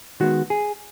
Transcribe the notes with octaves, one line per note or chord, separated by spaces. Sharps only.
D#3 G#3 B3 F#4
G#4